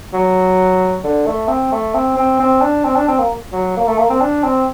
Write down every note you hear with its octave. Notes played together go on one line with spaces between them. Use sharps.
F#3
D3
A3
C4
A3
C4
C4
C4
D4
C4
D4
C4
A#3
F#3
A#3
A3
A#3
C4
D4
C4